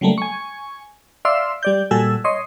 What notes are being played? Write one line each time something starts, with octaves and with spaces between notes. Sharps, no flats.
C#3 F#3 G3 A3 A#3
G#5 C#6
D5 E5 F5 C6 E6
G3 D5 G6
A#2 G3 F#4 A4 G#5 E6
C#5 D#5 C6